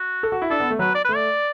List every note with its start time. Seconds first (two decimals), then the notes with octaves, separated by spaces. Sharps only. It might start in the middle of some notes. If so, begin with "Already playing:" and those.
Already playing: F#4
0.23 A4
0.32 F#4
0.42 E4
0.50 D4 A4
0.60 B3
0.70 A3
0.79 F#3 B4
0.95 D5
1.04 A3 B4
1.15 D5